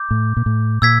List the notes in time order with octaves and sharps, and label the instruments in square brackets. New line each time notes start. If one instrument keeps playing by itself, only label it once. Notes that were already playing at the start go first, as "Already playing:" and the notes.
Already playing: [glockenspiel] D6 G6
[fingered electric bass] A2
A#2
A2
[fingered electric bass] A#2 [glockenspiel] E6 G#6 B6